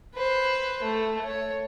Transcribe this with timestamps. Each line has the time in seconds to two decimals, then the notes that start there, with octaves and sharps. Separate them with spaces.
0.14 B4 C5
0.82 A3
1.24 C#5